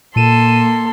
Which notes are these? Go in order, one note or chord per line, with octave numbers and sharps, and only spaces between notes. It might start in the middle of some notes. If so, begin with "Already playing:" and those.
A#2 A#3 A4 C6 D#7 E7